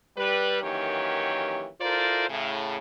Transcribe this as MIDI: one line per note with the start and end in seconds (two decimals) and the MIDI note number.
0.18 0.60 55
0.18 0.60 71
0.62 1.68 42
0.62 1.68 51
0.62 1.68 52
0.62 1.68 58
0.62 1.68 67
0.62 1.68 73
1.81 2.29 64
1.81 2.29 65
1.81 2.29 69
1.81 2.29 70
1.81 2.29 72
1.81 2.29 74
2.29 2.77 45
2.29 2.77 49